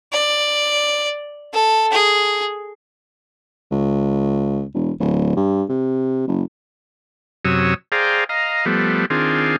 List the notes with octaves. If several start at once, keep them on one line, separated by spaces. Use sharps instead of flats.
D5
A4
G#4
C#2
E1
D1
G2
C3
F#1
F#2 C3 F#3 C#5 D#6 E6
G#4 C5 D5 F5 G5 A#5
D#5 F5 A#5
F3 G3 A3 B3
D#3 C4 D4 F4 G#4